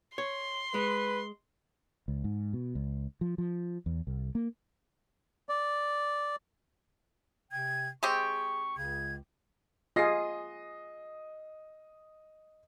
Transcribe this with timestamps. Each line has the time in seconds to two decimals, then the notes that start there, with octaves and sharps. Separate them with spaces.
0.18 C#5 C6
0.74 G#3 B4
2.08 C#2
2.24 G#2
2.53 B2
2.75 C#2
3.21 F3
3.38 F3
3.86 E2
4.07 C2
4.35 A#3
5.49 D5
7.52 C3 G5 G#6
8.03 G#3 C4 G4 G#4 C#6
8.77 C#2 C#3 G#6
9.96 F4 G#4 D#5 A#6 C7